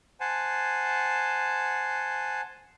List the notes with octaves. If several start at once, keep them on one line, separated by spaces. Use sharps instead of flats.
C5 F#5 G#5 A5